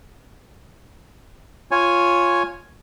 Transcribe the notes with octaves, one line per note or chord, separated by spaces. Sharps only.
F4 C#5 G#5